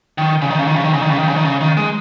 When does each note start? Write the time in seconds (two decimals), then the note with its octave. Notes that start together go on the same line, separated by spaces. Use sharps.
0.18 D#3
0.42 C#3
0.51 D#3
0.59 C#3
0.68 D#3
0.76 C#3
0.84 D#3
0.93 C#3
1.02 D#3
1.10 C#3
1.19 D#3
1.28 C#3
1.36 D#3
1.45 C#3
1.61 D#3
1.77 G#3